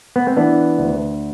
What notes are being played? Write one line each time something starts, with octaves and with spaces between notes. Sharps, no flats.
B3
C4
E3 B3 D4
D2